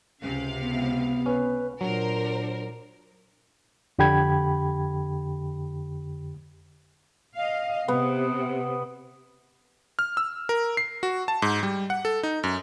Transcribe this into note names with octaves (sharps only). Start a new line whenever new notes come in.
C#2 C3 C#4 F5
B3
C#4 B4
A#2 F#3 D4 A#4 C5
F2 D3 G4 G5 B5 G#6
D#5 F5
C3 B3
F6
E6
A#4
C7
F#4
A5
G#2
G3
F#5
A4
D#4
F#2